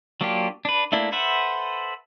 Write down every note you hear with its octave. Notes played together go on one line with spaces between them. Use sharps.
F#3 A#3 D4 F4 G4
D4 B4
A3 A#3 D4 E4
A4 B4 C5 E5 F#5